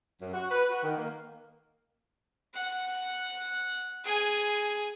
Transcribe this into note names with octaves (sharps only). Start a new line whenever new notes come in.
F#2
F#4
B4
F#4
D#3
A#3
F#5
G#4 G#5